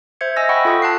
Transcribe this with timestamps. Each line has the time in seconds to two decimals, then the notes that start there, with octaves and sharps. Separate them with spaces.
0.21 C5 E5 G6 G#6 C#7
0.36 D#5 E5 G#5 E6 A#6
0.49 F#5 G5 B5 C#6
0.65 F4 A4 C#6 D#6
0.82 A5 F#6 C7